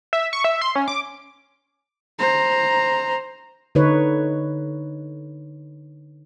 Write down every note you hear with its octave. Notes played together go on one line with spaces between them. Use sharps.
E5
C#6
E5
C6
C#4
D6
C5 A#5
D3 D#4 B4 C#5